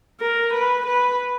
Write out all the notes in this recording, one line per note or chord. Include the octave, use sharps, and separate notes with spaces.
A#4
B4
B4